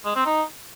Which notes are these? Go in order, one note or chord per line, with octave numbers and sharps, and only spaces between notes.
G#3
C4
D#4